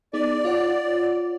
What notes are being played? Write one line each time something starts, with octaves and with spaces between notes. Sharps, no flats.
B3 D#4 G#4 D5
F4 C#5 F#5